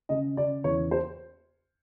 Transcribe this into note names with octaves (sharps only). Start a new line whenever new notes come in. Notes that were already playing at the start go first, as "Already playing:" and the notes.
C#3 D#5
C#3 D5
E2 C#5
C5